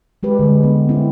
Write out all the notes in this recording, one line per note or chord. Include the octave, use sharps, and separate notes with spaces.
G3 G#3 G4 B4
D3 G#3
B3
C4 E4